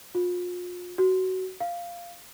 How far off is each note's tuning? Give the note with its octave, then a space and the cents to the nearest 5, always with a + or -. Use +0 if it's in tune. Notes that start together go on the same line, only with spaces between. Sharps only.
F4 +35
F#4 +15
F5 -10